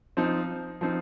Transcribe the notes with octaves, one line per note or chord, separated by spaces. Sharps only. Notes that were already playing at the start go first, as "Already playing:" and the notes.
F3 C4 D#4
F3 C4 D#4